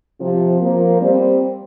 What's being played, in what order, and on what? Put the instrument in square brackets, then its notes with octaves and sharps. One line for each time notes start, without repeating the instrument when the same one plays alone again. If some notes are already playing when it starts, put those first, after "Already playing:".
[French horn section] C3 F3
F3 A#3
G3 C4